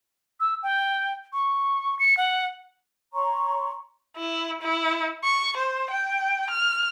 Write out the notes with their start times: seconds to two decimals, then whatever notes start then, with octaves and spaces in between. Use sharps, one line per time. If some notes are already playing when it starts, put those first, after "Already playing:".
0.40 E6
0.63 G5
1.33 C#6
1.99 C#7
2.17 F#5
3.14 C#5 A#5 C6 C#6
4.17 E4
4.61 E4
5.24 C#6
5.57 C5
5.91 G5
6.50 F6